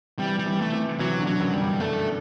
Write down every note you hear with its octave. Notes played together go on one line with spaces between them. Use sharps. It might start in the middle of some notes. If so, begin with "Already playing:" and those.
C3 E3 G3
G3
C3 E3
A3
C3 E3
C3 E3 F#3
B2 D3
F#3
F#2
G3
G2
A3